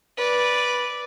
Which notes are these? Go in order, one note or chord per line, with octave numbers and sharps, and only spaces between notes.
B4 D5